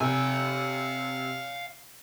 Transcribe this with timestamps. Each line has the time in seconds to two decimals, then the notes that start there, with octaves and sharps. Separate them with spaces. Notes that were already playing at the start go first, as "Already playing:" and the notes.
0.01 C3 F5 G#5